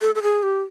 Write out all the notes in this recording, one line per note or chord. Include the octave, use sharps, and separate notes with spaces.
A4
A4
G#4
G4